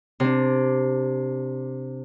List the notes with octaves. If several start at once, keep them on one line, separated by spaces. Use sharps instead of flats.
C3 D4